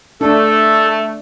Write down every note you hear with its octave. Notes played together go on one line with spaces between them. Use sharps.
A3 D4 A4